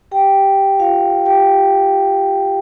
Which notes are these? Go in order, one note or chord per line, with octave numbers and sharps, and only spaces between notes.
G4 G5
F4 F5
G4 G5